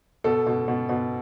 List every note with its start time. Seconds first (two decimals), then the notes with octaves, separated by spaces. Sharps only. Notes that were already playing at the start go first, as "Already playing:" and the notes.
0.24 B2 A4
0.47 B2
0.68 B2
0.89 B2